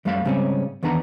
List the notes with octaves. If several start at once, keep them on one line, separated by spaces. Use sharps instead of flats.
F#2 G3 A3 F5 A#5 B5
G#2 C#3 G3 A#3 C4 C#4
E2 D#3 B3 D4 A#5 B5